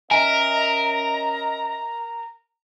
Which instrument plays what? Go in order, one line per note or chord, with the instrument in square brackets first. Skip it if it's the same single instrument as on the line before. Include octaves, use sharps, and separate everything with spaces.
[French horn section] C#4 D#5 [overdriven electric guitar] A#4 [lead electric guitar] E5 G#5 [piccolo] A#5